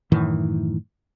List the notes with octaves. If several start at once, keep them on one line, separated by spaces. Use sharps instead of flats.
F#2 A2 D#3 E3